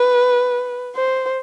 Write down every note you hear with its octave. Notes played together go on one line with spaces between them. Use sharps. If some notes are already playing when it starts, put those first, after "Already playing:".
Already playing: B4
C5